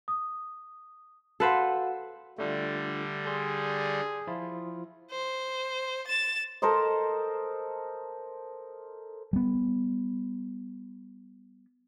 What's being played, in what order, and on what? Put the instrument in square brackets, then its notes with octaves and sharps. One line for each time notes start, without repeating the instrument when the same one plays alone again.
[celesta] D#6
[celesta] F#4 F5 F#5 [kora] A4 B4 C5
[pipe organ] D3 G3 [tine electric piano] A3 D4 F4
[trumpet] G#4 [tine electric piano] D5 C6 G6
[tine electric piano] F3 E4 F4
[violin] C5
A6 E7
[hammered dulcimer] A4 A#4 C5 D#5
[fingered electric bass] G3 B3